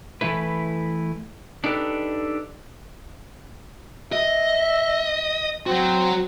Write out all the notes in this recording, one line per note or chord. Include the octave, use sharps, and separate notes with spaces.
E3 A3 E4 B4
D4 D#4 G4 A4 B4
D#5 E5
F#3 C4 F#4